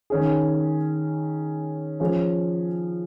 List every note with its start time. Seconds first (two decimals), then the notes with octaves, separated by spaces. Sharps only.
0.10 D#3 C#4 G#4
2.00 F3 C#4 G#4